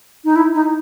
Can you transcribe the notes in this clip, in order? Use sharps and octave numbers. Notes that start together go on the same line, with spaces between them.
D#4
E4
D#4